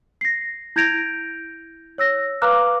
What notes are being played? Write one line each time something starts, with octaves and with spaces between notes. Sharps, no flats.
A#6 C7
E4 G6 G#6 A#6 D7 F7
C#5 E6 A#6
B4 F5 A#5 D6 F6 F#6